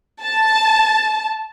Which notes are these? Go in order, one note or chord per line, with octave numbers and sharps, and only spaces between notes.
A5